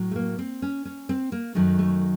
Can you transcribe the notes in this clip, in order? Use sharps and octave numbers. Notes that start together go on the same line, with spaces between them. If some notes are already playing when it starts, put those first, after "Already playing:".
Already playing: A2 F#3
A3
A#3
C4
C#4
C#4
C4
A#3
F#2 D#3 F#3 A3
A3